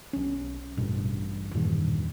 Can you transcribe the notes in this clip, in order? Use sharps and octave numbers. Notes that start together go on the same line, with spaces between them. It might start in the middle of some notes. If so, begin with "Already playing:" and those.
B1 C#4
A1 G2 B2
E2 G2 A#2 D#3